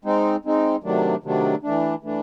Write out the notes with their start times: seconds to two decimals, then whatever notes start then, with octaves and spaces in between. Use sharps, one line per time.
0.04 G#3 C4 D#4
0.45 G#3 C4 D#4
0.83 C3 D#3 F#3 A3 D4
1.23 C3 D#3 F#3 A3 D4
1.63 E3 A3 D4
2.03 E3 A3 D4